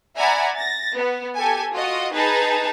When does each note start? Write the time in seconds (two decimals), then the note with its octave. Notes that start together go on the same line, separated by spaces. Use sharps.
0.18 D5 E5 F#5 G#5 A#5 B5
0.56 A6 A#6
0.95 B3
1.36 G4 A4 G#5
1.73 F4 F#4 D#5
2.13 D#4 G#4 B4 A5 A#5